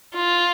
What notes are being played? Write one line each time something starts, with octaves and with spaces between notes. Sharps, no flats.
F4